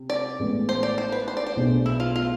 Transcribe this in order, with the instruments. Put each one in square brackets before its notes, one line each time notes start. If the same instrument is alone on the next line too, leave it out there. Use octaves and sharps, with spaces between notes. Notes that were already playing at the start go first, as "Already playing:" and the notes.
Already playing: [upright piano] C3
[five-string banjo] D5
[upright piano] A1 A2 G#3 B3
[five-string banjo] C5
D5
C5
B4
C5
D5
C5
[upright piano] B1 B2 A3 D4 G#4
[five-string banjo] E4
F4
F4